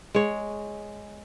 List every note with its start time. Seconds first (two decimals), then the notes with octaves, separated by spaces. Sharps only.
0.15 G#3 C#5